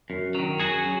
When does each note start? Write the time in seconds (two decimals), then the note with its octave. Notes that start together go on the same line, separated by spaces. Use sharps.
0.10 F#2
0.35 D#3 F#3
0.59 F#2 F#4 G#4
0.85 F#3